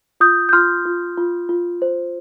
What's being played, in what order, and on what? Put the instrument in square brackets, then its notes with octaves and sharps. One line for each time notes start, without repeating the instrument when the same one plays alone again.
[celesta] F4 D#6 G6
G6
F4 C6 F6
F4
F4
F4
C5